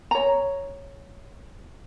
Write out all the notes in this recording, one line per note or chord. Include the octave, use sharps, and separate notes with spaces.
C#5 A#5